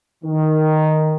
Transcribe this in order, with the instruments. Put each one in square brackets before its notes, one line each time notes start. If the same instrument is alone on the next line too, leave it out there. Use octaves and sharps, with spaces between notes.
[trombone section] D#3